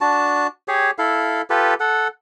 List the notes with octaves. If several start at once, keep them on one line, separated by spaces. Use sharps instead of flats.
D4 F#4 A5
G4 G#4 C#5
E4 A4 F5
F4 G4 A4 B4
A4 F#5